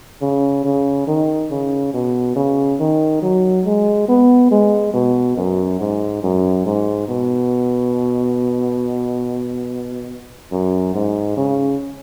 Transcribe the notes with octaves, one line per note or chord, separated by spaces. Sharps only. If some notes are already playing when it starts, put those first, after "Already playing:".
C#3
C#3
D#3
C#3
B2
C#3
D#3
F#3
G#3
B3
G#3
B2
F#2
G#2
F#2
G#2
B2
F#2
G#2
C#3